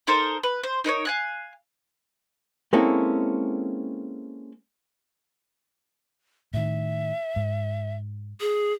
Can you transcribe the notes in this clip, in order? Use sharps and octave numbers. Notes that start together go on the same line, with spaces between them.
D#4 A4 A#4 C5
B4
C5
D#4 A#4 B4 C#5
F5 G#5 F#6
G#3 A#3 C4 C#4 E4 A4
A2 D#3 E5
G#2
G#4